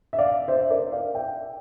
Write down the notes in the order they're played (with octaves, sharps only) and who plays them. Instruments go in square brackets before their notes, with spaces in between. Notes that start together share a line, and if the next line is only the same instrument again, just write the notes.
[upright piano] E5
D5 F5
C5 E5
E5
A#4 D5
D5 F5
E5 G5